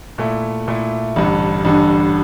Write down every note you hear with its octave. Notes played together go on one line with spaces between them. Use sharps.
A#2 A3 E4
A#2 A3 E4
A1 G2 D3
A1 G2 D3